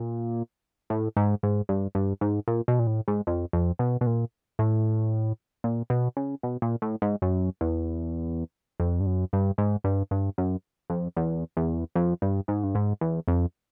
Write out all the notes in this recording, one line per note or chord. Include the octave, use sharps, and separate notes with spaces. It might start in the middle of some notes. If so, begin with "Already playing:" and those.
Already playing: A#2
A2
G#2
G#2
G2
G2
G#2
A#2
B2
A#2
A2
G#2
F2
F2
B2
B2
A#2
A2
A#2
B2
C#3
B2
A#2
A2
G#2
F#2
E2
F2
G2
F#2
G2
G#2
G2
G2
F#2
F2
E2
E2
F2
G2
G#2
G2
G#2
E2
F2